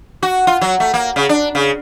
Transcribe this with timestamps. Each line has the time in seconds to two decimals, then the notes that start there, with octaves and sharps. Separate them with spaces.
0.23 F#4
0.47 F4
0.61 F#3
0.80 A3
0.94 A#3
1.16 C#3
1.29 D4
1.55 C#3